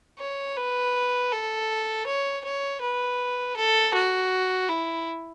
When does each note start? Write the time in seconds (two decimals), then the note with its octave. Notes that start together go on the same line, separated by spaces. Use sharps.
0.19 C#5
0.57 B4
1.32 A4
2.06 C#5
2.44 C#5
2.81 B4
3.56 A4
3.94 F#4
4.69 E4